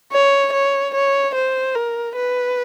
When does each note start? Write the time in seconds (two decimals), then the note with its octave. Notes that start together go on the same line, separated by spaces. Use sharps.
0.13 C#5
0.53 C#5
0.94 C#5
1.35 C5
1.75 A#4
2.16 B4